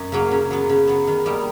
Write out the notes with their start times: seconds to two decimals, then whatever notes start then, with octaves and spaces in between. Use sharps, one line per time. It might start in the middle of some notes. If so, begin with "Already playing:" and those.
Already playing: F#2
0.12 C#3 F#3 A#3
0.31 C#3
0.51 F#3 B3
0.69 C#3
0.87 F#3 B3
1.07 D#3
1.26 G3 A#3 D#4